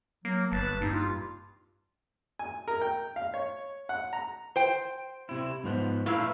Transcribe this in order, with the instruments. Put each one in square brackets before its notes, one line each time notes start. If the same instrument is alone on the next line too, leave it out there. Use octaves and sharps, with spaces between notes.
[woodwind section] F#3 [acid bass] A#3
[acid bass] G1 [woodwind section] B4 A5
[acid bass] G2 [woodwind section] A#3 C4 D#4
[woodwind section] F4
[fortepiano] G#5
A#4
G5
F5
C#5
F#5
A#5
[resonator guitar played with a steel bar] C5 G5
[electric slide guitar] C3 E4
G#2 F3 B3
[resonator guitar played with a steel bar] A#2 E4 [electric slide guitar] A3 B4 F5